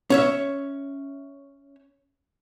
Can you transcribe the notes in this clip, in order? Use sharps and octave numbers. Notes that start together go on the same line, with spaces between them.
C#4 C#5 E5